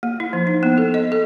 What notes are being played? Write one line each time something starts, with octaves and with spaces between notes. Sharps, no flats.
A#3
E4
F3
D#4
B3
A4
D#5
A4